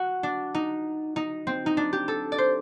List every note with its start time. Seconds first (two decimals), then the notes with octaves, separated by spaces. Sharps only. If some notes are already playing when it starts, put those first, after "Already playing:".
Already playing: F#4
0.23 D4
0.55 D#4
1.16 D#4
1.47 C4
1.66 D#4
1.77 D4
1.93 G4
2.08 A4
2.32 D5
2.38 C5